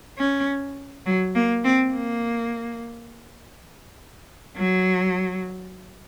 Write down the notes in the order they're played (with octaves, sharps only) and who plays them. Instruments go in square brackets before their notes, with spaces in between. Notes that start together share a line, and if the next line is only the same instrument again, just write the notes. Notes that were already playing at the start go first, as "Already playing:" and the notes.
[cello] C#4
F#3
A#3
C4
A#3
F#3